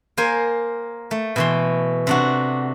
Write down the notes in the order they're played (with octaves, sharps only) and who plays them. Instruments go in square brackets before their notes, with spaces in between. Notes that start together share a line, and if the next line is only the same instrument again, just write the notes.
[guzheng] A#3 A#4 C5 G#5
A3
B2 E3 C6
C3 D4 F#4